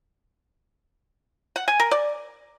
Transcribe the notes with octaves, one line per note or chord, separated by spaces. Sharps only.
F#5
G#5
A#4
D5